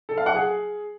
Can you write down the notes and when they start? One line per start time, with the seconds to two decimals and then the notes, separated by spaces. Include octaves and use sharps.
0.09 A4
0.18 F5
0.26 F#5
0.35 G#4